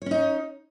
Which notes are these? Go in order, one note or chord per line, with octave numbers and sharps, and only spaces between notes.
C#4 D#4 C#5